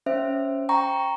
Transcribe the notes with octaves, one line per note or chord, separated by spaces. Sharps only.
C#4 C5 E5
G5 A#5 C#6